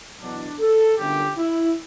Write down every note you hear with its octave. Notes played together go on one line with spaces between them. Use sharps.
E2 B2 F#3 D4
A4
G1 F#2 D3 G4
E4